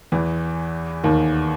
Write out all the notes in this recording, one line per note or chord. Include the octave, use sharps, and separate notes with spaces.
E2 E3
D#2 D#3